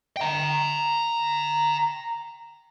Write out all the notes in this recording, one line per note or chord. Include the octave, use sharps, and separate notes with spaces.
G5 A#5